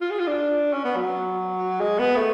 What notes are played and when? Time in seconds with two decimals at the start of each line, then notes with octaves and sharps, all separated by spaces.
0.01 F4
0.10 G#4
0.19 F4
0.27 D4
0.73 C#4
0.84 B3
0.96 F#3
1.80 G#3
1.99 B3
2.16 A3